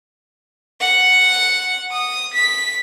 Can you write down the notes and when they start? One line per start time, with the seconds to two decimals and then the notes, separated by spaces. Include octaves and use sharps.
0.81 F#5
1.91 D#6
2.34 B6